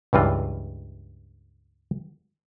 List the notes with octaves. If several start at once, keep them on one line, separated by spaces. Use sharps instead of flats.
C#2 G2 E3 F4